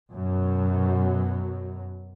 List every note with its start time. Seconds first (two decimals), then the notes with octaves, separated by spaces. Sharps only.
0.11 F#2 B2 F#3